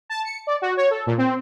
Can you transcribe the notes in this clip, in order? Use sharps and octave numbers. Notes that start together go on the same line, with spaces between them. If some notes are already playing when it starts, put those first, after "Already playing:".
A5
C#7
D5
F#4
C#5
A4
A#2
C4